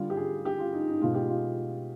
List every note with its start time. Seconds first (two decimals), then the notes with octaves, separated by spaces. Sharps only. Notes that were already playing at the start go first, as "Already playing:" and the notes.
Already playing: D3 G3 F4
0.10 G4
0.17 G#4
0.45 G4
0.59 F4
0.73 D#4
0.87 D#4
1.01 B2 G#3 F4
1.14 G4
1.28 F4